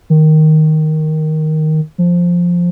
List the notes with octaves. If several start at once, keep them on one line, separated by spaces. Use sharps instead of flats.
D#3
F3